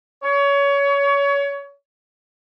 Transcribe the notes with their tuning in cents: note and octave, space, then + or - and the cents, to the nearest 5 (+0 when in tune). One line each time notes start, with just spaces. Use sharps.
C#5 +25